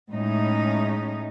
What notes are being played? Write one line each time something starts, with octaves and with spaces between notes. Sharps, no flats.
A2 G#3 C#4 D#4